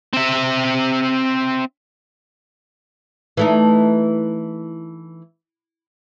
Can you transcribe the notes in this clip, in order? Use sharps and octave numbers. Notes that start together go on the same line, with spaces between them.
C4 E5
E3 A3 D#4